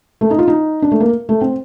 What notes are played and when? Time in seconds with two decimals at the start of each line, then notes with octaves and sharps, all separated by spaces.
0.21 A3
0.31 D#4
0.39 F4
0.48 D#4
0.82 D4
0.92 A3
1.00 A#3
1.29 A3
1.41 C4